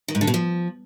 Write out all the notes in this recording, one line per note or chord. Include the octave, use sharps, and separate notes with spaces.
D#3
G#2
D3
B2
F3